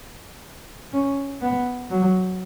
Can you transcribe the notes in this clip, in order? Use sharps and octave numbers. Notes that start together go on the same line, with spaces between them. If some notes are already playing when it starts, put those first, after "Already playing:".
C#4
B3
F#3